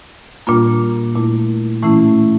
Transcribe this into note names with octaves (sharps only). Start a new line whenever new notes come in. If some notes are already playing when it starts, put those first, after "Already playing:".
A#2 G3 A#3 D4 F4
A#2 A3 E4
A2 E3 A3 C#4 E4